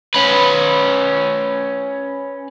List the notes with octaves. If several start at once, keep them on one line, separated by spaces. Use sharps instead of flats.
C#4 B4